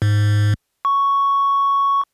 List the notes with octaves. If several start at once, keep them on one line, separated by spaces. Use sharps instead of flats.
G#2
C#6